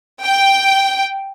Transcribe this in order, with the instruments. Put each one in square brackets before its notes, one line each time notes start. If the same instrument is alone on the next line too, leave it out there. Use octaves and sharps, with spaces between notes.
[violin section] G5